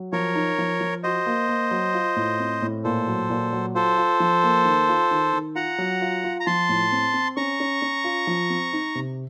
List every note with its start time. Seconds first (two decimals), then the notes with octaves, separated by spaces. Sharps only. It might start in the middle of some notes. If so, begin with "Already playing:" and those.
Already playing: F#3
0.12 F3 A#4 C#5
0.35 D#4
0.58 F3
0.81 F3
1.03 F#4 C5 D#5
1.26 A#3
1.49 A#3
1.71 F#3
1.94 F4
2.16 A2
2.40 C4
2.62 A2
2.84 A#2 A4 C5
3.07 F#3
3.30 A#2
3.53 F#3
3.75 F4 A4 C5
3.97 F4
4.20 F3
4.43 A#3
4.65 D#3
4.89 F4
5.11 D#3
5.33 D#3
5.55 F4 F#5 A#5
5.78 F#3
6.01 F4
6.24 F4
6.40 A#5
6.46 F3 A5 C6
6.69 A2
6.92 C4
7.14 C4
7.36 C#4 A#5 C#6
7.60 C#4
7.82 C#4
8.04 F4
8.27 F3
8.50 C4
8.73 D#4
8.95 C3